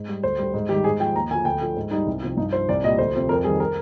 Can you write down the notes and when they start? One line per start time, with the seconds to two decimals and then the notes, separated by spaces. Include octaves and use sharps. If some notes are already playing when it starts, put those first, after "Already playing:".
Already playing: G#2
0.08 G3
0.23 D2 C5
0.38 D3 G3
0.54 G#2
0.69 D#3 G3 G4
0.84 G#2 G#4
1.00 F3 G5
1.15 D#2 A#5
1.30 D3 G#5
1.35 F3
1.45 D2 G5
1.61 D3 F3
1.77 G#2
1.91 G3 D#4
2.07 C2
2.23 C3 F3
2.37 G2 D#4
2.53 F3 C5
2.69 C2 D5
2.83 A#2 D#5
2.87 G3
2.98 D2 C5
3.15 C3 F3
3.29 F2 A#4
3.44 D#3 G3 G#4
3.60 A#4